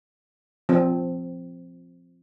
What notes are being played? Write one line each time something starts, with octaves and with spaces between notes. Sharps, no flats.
F3 C4